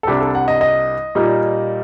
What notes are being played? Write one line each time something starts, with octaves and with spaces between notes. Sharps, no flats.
A4
C2 C3 G3 D4 G4
A4
F#5
D#5
D#5
A#2 G3 A#3 D#4